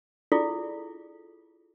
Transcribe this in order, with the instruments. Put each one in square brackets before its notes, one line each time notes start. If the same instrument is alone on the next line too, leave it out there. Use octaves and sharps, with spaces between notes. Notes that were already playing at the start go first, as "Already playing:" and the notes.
[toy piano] E4 F4 G#4 A4 D5